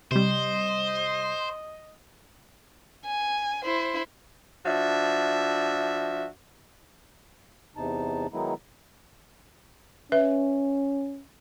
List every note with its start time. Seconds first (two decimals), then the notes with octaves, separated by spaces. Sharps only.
0.11 C3 G3 C5 D#5
3.05 G#5
3.64 E4 C5
4.66 F3 D4 F#4 E5
7.76 E2 C3 D#4 A5
8.33 D#3 F#3 G#3 B3 D#4 E4
10.12 C#4 B4 E5